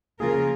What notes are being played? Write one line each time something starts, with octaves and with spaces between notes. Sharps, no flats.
C#3 F3 A#3 F4 G#4 A#4